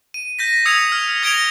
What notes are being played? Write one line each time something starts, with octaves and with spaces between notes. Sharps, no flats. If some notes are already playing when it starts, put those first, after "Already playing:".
D#7
G6 A#6 B6
D#6 E6 G#6 C#7 F7
F6
D#6 G#6 A#6 D7 F7 G7